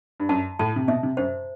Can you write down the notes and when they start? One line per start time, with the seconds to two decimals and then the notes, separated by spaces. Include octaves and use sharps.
0.20 G2
0.29 F#2 A5
0.59 A2 A5
0.76 C3
0.88 B2 E5
1.03 C3
1.17 F#2 C5